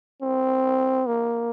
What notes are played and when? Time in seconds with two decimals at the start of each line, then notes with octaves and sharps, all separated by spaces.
0.22 C4
1.06 A#3